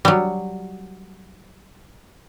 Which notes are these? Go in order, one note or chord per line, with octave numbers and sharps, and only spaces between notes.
F#3 G3